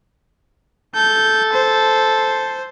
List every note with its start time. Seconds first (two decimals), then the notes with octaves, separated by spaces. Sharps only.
0.95 A4 G6
1.53 C5